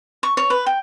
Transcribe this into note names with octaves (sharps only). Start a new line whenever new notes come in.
C#6
C#5
B4
G5